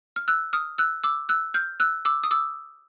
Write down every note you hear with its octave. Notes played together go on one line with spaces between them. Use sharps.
F6
E6 F#6
D#6 F6
E6 F#6
D6 E6
E6 F#6
F6 G6
E6 F#6
D6 E6
D#6
D6 E6